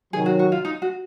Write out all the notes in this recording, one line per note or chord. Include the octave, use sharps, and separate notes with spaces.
C3 D#3 F#3 G#4
F#4
F#4
F4
D#4
F#4